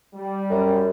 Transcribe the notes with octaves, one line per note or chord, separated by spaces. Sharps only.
G3
F#2